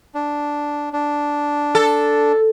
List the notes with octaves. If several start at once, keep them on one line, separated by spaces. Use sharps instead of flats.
D4
D4
A4